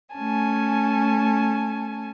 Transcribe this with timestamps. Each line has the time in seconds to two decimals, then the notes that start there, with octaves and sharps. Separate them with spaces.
0.15 A3 C#4 G#5 A5